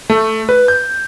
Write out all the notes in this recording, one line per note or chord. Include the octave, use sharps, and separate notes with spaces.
A3
B4
G6